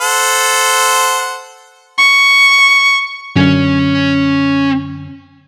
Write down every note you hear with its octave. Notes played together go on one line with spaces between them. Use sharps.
A4 C5 F#5
C#6
F#2 D3 C#4